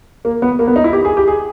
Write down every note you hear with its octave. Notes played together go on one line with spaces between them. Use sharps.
A#3
B3
A#3
B3
D#4
E4
G4
G#4
G4
G#4